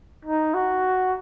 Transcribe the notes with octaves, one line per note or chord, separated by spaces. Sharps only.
D#4
F#4